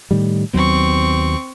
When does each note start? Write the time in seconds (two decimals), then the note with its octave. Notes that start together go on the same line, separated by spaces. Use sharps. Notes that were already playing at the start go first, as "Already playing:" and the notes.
0.11 A2 D#3 G3
0.53 D#2 F#3 B3 C4 C#6